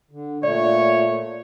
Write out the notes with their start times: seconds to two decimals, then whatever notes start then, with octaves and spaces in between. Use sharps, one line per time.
0.11 D3
0.43 A#2 A3 C#5 D5